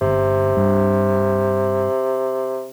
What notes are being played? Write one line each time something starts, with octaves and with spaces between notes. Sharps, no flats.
G1 C3
G2